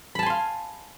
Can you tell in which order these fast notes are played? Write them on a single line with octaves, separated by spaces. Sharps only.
B5 A5 G#5 C6 F5